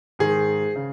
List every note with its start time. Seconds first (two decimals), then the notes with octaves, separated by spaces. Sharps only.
0.19 G#2 D#3 G#4
0.76 C#3